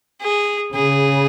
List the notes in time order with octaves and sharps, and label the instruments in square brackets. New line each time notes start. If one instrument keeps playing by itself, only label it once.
[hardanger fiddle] G#4
[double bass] C#3 [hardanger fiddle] G#4